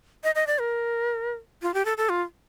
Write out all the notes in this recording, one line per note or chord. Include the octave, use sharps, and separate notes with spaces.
D#5
D#5
D5
A#4
F4
G4
A4
A4
F4